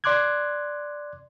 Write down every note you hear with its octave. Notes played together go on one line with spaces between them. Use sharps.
D5 C6 D6 F#6 G#6